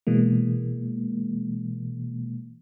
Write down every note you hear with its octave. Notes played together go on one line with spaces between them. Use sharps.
B2 E3 G#3 A#3